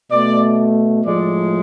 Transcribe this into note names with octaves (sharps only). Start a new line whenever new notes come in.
B2 A3 D5
A2 F3 G#3 D5